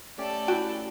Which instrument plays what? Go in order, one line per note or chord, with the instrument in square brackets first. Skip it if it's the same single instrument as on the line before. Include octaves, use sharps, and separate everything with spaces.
[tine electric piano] A3 C#4 G4 [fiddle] A4 D5
[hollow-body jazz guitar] E4 G5 [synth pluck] F#4